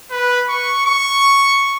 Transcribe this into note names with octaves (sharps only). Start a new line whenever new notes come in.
B4
C#6
C#6